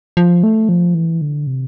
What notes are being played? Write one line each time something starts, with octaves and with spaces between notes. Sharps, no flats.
F3
A3
F3
E3
D3
C3